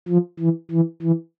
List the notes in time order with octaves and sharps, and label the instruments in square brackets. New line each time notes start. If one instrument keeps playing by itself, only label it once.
[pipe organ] F3
E3
E3
E3